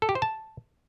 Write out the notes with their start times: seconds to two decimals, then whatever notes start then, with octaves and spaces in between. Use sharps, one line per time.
0.02 A4
0.09 G4
0.15 C5
0.22 A5